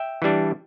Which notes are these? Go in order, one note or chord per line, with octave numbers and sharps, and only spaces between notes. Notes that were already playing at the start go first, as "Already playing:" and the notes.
Already playing: E5 G5
E3 G3 D4